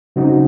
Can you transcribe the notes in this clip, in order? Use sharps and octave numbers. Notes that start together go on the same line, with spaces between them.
C#3 F#3 C4 D#4 F#4